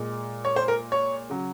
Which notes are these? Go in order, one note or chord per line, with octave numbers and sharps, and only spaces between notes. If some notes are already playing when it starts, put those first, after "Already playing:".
Already playing: A#2 G#3
C#5
C5
A#4
C#5
C#3 F#3